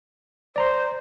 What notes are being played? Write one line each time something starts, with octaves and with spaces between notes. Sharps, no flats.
C5 D5 A#5 C6